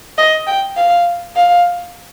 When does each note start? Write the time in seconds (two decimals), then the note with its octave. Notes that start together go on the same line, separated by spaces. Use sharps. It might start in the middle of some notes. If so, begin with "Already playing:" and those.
0.18 D#5
0.47 G5
0.76 F5
1.36 F5